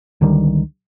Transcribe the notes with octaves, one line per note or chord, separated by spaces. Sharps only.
C#2 D3 D#3 G3